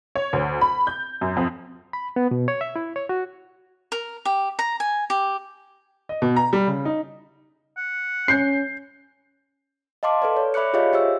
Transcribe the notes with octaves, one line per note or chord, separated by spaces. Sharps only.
C#5
D2
B5
G6
F#2
F2
B5
B3
B2
C#5
E5
E4
C#5
F#4
A#4
G4
A#5
G#5
G4
D#5
B2
A#5
G3
C#3
D#4
F#5
C#4 G6 C7
D#5 F5 A5 C6 D6
A4 B4 D5
C#5
D5 E5 B5 D6 F#6 C#7
F4 G4 G#4 C#5 D#5 F5
G4 C5 E5 E6